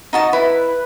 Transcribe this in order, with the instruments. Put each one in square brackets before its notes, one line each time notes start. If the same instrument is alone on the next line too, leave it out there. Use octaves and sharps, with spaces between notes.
[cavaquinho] D#4 F#4 A5 [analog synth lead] D#5
[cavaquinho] E4 [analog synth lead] B4